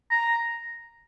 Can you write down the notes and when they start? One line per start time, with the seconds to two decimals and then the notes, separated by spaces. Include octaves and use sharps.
0.10 A#5